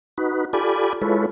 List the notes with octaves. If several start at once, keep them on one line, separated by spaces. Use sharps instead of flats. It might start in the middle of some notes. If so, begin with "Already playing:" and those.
D#4 F#4 B4
F4 G4 A4 D5 G#5 B5
G#3 E4 F4 A4 B4 C#5